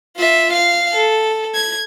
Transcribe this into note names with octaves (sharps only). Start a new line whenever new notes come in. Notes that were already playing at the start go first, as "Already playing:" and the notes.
F4 E5
F5
A4
G#6